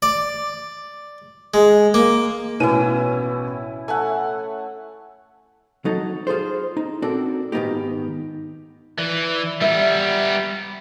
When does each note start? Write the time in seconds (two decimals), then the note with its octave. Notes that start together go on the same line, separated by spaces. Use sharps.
0.02 D5
1.54 G#3
1.94 A#3
2.60 A1 B2 C#4 E4 D#7
3.88 A3 E5 F#5 G#5
5.85 F#3 D#4 A4
6.27 F4 G#4 A4 C5
6.77 D#4
7.02 C4 D4 F#4 A4 A#4 D5
7.52 G#2 D#3 G3 B3 D#4 G4
8.98 E3 D5
9.61 G3 B3 E5